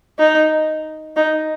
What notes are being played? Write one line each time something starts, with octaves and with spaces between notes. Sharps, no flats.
D#4
D#4